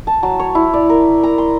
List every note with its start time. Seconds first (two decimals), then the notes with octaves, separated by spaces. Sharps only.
0.07 A5
0.23 F#3
0.40 C#5
0.55 E4
0.74 D5
0.89 A#4
1.23 A#5
1.38 C6